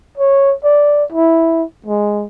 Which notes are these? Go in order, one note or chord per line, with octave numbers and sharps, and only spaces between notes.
C#5
D5
E4
G#3